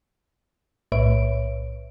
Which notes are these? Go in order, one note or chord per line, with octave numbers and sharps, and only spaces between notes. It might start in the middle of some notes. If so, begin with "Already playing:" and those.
B1 A2 B4 C#5 E5 D7